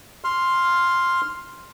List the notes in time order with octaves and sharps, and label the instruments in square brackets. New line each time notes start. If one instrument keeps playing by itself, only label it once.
[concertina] C6 F6